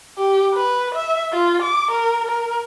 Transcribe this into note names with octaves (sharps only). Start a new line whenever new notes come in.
G4
B4
E5
F4
D6
A#4
A#4